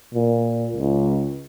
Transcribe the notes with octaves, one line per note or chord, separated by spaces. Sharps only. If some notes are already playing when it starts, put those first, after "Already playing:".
A#2
C#2